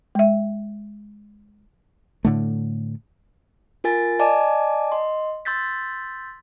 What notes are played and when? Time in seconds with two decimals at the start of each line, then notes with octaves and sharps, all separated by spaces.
0.15 G#3 E5
2.25 A2 D3 A3
3.84 F4 A#4 G#5 A6
4.19 D5 D#5 G#5 A5 D6
4.92 D#5 C6
5.45 C6 E6 G6 A6 B6